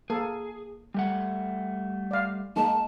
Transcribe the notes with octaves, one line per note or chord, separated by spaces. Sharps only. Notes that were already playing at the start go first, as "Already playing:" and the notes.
A#3 G#4 A4
G3 A3 F#5
D5 F5
G#3 A#3 D#4 A5